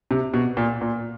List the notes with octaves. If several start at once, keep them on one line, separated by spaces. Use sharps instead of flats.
C3
B2
A#2
A#2